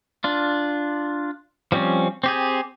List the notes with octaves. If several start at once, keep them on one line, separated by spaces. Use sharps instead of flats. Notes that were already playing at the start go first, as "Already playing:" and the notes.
D4 F4
F3 G3 C4 C#4
C4 G4 G#4